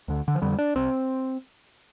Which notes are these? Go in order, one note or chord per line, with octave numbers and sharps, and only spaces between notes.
D2 D3
D3
F3
F2 D3 G3
D4
C2 C3 C4